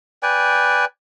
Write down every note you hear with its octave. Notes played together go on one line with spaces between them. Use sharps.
B4 D5 G5 G#5